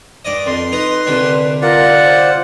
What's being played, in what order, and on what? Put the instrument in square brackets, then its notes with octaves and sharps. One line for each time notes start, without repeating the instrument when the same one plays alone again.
[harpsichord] G2 D5 D#5
[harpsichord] F2 [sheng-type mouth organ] C6
[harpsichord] D#4 A#5 [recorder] B4
[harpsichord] C2 D3 G3
[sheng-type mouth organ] F4 D5 F#5 [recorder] A#4
[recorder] C5